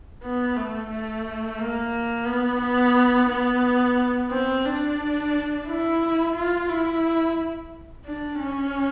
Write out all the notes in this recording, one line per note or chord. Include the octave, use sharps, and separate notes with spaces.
B3
A3
A3
A#3
B3
B3
B3
C4
D4
E4
F4
E4
D4
C#4